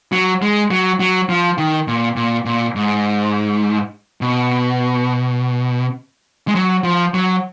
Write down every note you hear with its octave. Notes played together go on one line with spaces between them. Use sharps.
F#3
G#3
F#3
F#3
F3
D#3
A#2
A#2
A#2
G#2
B2
G#3
F#3
F3
F#3